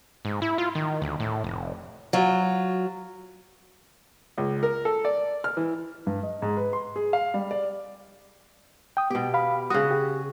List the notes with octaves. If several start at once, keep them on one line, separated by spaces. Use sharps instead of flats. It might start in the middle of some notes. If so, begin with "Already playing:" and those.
G#2
E4
F4
D#3
D2
A2
F1
F#3 F4
C#2
A#4
A4
D5
F6
E3
G2
D#5
G#2
B4
C6
G#4
F5
G3
D5
G5 D#6
B2 B3 G4
F5 B5
C#3 F#4 D#6
G4 G#4